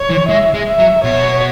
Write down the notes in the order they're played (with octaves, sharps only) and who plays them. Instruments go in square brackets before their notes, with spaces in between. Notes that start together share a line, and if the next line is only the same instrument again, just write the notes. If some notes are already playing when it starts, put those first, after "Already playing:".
Already playing: [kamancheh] C#5
[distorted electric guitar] E3
[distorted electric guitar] G#3 [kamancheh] E5
[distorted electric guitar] G#3
[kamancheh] E5
[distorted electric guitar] F#3
[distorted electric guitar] B2 [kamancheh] C#5